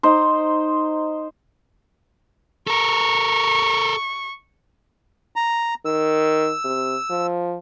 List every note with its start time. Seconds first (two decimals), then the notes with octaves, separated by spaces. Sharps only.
0.03 D#4 C5
2.67 A4 A#4 C#6
5.36 A#5
5.85 D#3 E6
6.64 C3
7.10 F3